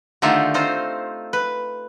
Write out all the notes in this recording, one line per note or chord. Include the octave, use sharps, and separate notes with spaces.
D3 D#3 A3 D#4 F4 G4
C4 D#4 F4 C5
B4